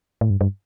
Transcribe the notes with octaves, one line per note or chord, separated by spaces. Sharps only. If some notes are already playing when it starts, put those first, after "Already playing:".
A2
G2
G2